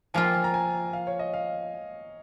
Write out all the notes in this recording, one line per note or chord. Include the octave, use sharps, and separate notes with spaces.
F3 A#3 F4 G#5
G5
G#5
A#5
G#5
F5
C#5
D#5
F5